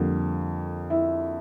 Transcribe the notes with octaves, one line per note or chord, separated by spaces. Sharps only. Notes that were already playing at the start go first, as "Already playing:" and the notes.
Already playing: F2 D3 G3 A#3
E4